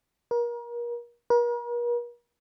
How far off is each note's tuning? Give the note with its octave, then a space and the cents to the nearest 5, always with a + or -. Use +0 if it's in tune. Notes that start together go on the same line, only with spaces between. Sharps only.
A#4 +35
A#4 +45